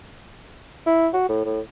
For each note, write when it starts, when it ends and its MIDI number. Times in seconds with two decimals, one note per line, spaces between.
0.87 1.08 64
1.13 1.27 66
1.29 1.41 45
1.45 1.60 45